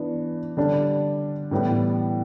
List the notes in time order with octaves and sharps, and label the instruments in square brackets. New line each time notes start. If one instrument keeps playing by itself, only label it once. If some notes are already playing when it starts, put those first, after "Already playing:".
Already playing: [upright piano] E3 B3 D4
D3 G3 D4
A2 E3 G3 B3